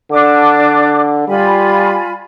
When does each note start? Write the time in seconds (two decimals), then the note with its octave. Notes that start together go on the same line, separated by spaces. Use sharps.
0.11 D3 D4 D6
1.28 G3 F4 G#5 B5